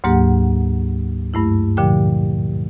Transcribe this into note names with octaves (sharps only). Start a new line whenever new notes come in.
D2 G#2 F#3 A#3 G4 F#5
G2 A3 E4
A#2 D3 F3 G4 G5